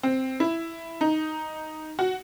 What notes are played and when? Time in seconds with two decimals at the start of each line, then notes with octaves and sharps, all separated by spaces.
0.03 C4
0.40 E4
1.01 D#4
1.99 F#4